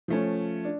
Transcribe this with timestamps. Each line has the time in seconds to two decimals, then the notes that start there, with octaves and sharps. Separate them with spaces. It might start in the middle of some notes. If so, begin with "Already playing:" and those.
0.08 F3 A3 C#4
0.65 D4